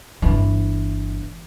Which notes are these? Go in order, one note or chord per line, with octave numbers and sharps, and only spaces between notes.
G1 E3